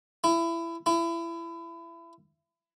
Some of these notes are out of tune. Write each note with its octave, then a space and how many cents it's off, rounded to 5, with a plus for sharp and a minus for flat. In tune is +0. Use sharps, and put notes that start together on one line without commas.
E4 +25
E4 +30